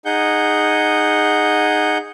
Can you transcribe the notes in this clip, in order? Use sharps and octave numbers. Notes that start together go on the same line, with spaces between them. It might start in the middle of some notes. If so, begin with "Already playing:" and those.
D#4 G#4 F#5 G6